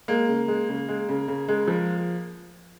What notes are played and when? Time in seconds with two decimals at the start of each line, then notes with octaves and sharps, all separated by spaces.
0.08 G#3 A#3
0.28 C#3
0.48 G#3
0.69 C#3
0.88 G#3
1.09 C#3
1.28 C#3
1.48 G#3
1.68 F3